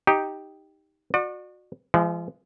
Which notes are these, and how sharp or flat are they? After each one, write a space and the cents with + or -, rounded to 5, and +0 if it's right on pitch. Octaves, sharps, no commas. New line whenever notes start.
D#4 +5 G4 +0
F#4 -25 D5 +35
F3 -40 G#3 +0